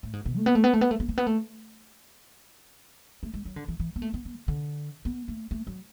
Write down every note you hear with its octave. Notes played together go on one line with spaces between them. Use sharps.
A2
G#2
B2
A3
B3
A3
B3
A3
B3
A3
B3
A3
B3
A3
A3
G#3
F#3
D3
E3
E3
B3
A3
B3
B3
D3
D3
B3
A3
A3
F#3